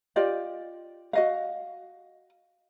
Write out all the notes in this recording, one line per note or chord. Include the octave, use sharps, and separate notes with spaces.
F4 G4 D5 D#5
F#4 D#5 F5